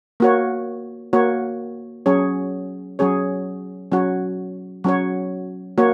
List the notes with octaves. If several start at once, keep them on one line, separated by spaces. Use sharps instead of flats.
A#3 F#4 C#5
A#3 F#4 C#5
F#3 C#4 G#4 C#5
F#3 C#4 G#4 C#5
F#3 C#4 F#4 C#5
F#3 C#4 F#4 C#5
A#3 F#4 C#5